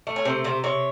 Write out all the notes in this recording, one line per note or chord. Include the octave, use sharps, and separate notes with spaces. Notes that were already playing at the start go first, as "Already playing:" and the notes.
A3
C#5
C3 C5
C3 C5
C3 C#5